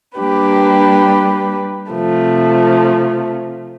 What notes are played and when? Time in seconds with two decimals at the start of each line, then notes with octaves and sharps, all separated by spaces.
0.18 G3 A#3 D4 G4 B4
1.91 C3 F3 A3